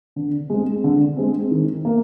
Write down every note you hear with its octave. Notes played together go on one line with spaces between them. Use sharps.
D3
G#3 C4
D3
G#3 C4
D#3
A#3